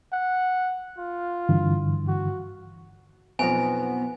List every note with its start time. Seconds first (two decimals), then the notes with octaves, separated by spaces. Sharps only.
0.13 F#5
0.98 F4
1.49 G2 D3 E3
2.08 F#4
3.39 B1 F2 B3 G#5 A#5